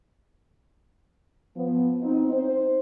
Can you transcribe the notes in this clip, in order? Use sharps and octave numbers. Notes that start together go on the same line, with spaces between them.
F3 B3
C4 D#4
C5